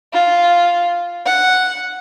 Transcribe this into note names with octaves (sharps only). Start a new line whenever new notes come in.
F4
F#5